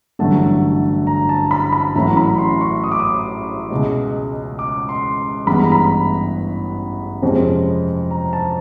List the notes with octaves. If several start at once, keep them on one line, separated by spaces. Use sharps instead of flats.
A1 G2 D3 F#3 A3 A5
A#5
A5
B5
B5
A1 A2 F#3 A3 C#4 A#5
B5
C6
C#6
D#6
D6
D#6
C#2 B2 G#3
D6
C6
A1 G2 E3 G#3 B3 B5
A#5
B5
F2 C3 F3 G#3 C#4
A#5
A5